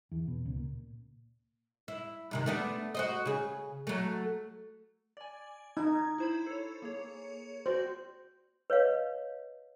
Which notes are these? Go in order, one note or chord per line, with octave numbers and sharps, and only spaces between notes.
E2
B2
C#2
A#2
E4
G2 C3 D#3
A3 B3 D4
F#4 C5 D#5
C#3 G#4
F#3 A3
D5 G#5
D#4 G#6
E4 C5 B5
A4 C#5
A#3 G#4 C#5
F#4 C5 D5
B4 C#5 D#5 F5